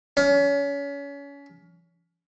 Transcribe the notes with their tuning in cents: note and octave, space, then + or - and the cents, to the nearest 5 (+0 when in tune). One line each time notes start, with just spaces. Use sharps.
C#4 +30